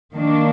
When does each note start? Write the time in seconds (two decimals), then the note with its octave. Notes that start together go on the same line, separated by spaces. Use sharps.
0.14 D#3 A#3 D4